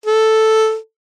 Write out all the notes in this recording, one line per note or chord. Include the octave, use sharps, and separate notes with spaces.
A4